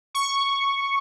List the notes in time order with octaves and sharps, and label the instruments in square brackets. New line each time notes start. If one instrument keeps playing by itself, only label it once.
[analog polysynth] C#6